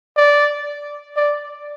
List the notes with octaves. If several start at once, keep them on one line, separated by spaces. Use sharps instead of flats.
D5
D5